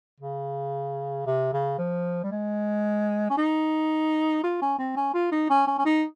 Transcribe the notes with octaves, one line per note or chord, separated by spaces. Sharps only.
C#3
C3
C#3
F3
G3
G#3
C#4
D#4
F4
C#4
C4
C#4
F4
D#4
C#4
C#4
C#4
D#4